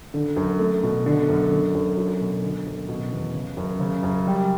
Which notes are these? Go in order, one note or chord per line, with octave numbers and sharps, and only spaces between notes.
D3
F#2
A3
B2
D3
F#2
D3
F#2
F#3
B2
D3
F#2
B2
E2
C#3
F#2
C#3
F#2
G3